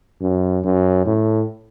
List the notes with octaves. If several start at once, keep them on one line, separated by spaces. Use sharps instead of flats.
F#2
F#2
A2